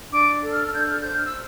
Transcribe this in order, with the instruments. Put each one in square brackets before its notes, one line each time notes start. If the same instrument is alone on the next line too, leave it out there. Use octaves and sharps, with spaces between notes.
[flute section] D4 D6
A4
F6
F6
D4 G6
F6
C5 G6
F6
E6